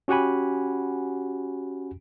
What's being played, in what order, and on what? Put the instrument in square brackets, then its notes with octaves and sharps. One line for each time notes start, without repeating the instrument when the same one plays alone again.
[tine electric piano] C#4 F#4 G4 F#5 G#5 B5